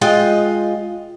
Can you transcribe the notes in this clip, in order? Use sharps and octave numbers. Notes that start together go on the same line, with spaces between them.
G#3 F4 D#5 G5